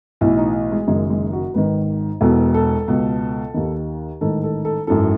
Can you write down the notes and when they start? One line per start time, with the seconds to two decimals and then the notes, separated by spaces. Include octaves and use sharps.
0.21 B1 A2 E3 E4
0.37 D#4
0.72 G#3
0.87 F#1 F#2 D#3 G#3
1.10 G#3
1.33 F#4
1.54 G#1 G#2 D#3 B4
2.21 E1 E2 B2 A4
2.54 A4
2.88 C#2 B2
3.54 D#2 D#3
4.21 A1 G#2 D#3 A4
4.43 A4
4.65 A4
4.87 G#1 F#2 E3 A4